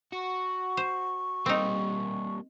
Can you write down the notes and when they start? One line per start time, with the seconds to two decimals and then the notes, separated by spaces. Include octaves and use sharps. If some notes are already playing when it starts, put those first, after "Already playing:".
0.13 F#4 C#6
0.77 C5
1.46 G3 A#3 C4 D#4